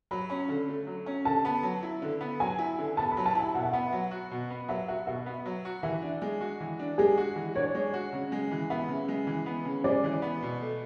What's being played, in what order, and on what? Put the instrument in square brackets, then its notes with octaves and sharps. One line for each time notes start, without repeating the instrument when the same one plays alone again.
[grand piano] F#3 [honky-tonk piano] B5
[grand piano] C#4
D3
A3
F#3
C#4
[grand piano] D3 [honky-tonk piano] A5
[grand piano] B3
F#3
E4
D3
B3
[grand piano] F#3 [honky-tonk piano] G#5
[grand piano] E4
D3
[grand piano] B3 [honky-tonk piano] A5
[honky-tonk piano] B5
[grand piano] F#3
[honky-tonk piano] A5
[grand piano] E4
[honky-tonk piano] G#5
[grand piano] B2 [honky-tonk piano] F#5
[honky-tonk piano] E5
[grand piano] B3 [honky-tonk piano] F#5
[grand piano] F#3
F#4
B2
B3
[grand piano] F#3 [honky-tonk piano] E5
[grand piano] F#4 [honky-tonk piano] E5
[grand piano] B2 [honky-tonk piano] E5
[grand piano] B3
F#3
F#4
[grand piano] E3 [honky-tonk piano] E5
[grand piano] D4
G#3
F#4
E3
D4
[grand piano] G#3 [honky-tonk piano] G#4
[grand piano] F#4
E3
[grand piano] D4 [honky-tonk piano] C#5
[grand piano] G#3
F#4
C#3
G#3
E3
[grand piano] B3 [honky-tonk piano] E5
[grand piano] C#3
G#3
E3
B3
C#3
[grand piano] G#3 [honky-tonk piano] D5
[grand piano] E3
B3
B2
A3